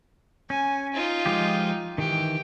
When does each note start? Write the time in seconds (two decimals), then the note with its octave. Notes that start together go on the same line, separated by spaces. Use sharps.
0.50 C#4 G#5
0.94 D#4 F4
1.26 F3 G#3 G4
1.98 D#3 E3 G4